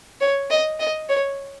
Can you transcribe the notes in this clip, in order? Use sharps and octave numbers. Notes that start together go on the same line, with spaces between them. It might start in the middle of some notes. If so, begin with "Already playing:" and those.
C#5
D#5
D#5
C#5